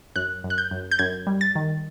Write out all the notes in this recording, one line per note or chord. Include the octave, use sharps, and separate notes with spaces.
F#2 F#6
F#2
F#6
G6
F#2
G6
F#2 G#6
G3
A6
D#3